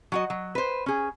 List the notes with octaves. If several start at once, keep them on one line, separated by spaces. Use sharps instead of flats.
F#3 F#4 D#5
F#3
B4 C5
C#4 G#4